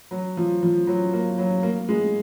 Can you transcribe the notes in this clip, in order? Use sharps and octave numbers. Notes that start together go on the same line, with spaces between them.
F#3
F3
F3
F#3
A#3
F#3
A#3
G#3